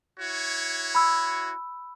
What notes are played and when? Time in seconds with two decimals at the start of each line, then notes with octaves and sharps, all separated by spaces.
0.20 E4 F#4 C#5
0.95 B5 E6